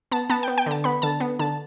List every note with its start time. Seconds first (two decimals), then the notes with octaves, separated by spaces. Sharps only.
0.12 B3 A5
0.30 B3 A5
0.43 B3 G5
0.58 G5
0.66 D3 A5
0.84 B3 B5
1.02 D3 A5
1.20 B3
1.39 D3 A5